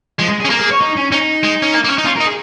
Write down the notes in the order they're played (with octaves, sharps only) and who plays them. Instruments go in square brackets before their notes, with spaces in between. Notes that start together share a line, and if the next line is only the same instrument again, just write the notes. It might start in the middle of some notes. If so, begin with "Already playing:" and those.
[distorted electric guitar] F3 [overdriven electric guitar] G#3
[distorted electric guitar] G#3
G#4
[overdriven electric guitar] C#4
[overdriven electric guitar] A#3 [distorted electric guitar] A#4
[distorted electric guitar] G#4
C#5
D#4
C#4
[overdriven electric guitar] C#4 [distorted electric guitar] D#4
[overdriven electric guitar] G#3
C#4
A#3
A#3
C#4
D#4
[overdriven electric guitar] C#4 [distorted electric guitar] F4
[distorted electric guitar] A#4
[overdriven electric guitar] D#4
[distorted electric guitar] G#4